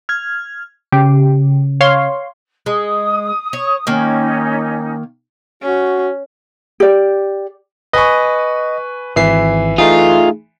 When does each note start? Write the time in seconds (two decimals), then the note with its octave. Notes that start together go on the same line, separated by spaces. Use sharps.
0.09 F6 G#6
0.92 C#3 G4
1.81 C#5 F5 C6
2.66 G#3 D#6
3.53 C#5
3.87 D#3 A#3 C#4 D#4
5.63 C#4 F#4
6.80 G4 D5
7.93 B4 D#5 G#5 C#6
9.16 G#1 E3 E5 C7
9.78 A3 D#4 F4 G#4